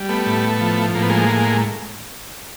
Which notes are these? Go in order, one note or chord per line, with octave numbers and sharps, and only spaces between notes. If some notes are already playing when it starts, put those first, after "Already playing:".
Already playing: G3
A3 B3
A2
F3
A2 A#3
B3
G#3 A#3